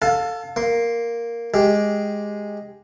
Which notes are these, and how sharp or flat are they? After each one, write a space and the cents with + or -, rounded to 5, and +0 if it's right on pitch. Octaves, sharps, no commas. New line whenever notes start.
A4 +20 F5 +25 A5 -35
A#3 +0 C6 +5
G#3 +0 G4 +0